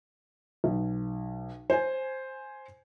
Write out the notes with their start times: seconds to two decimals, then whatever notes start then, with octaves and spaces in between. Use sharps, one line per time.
0.64 B1
1.70 C5 G#5